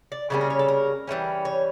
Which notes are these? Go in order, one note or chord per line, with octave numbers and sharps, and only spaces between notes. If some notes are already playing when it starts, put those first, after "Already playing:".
D5
C#3 G3 A#3 C#4 D5
A#4
C#5
A4
A#4
E3 G3 A#3 C#4
C#5